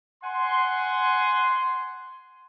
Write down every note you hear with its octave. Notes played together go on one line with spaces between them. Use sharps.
F#5 G#5 C6